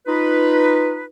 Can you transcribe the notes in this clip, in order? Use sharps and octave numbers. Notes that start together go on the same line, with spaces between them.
D#4 F4 B4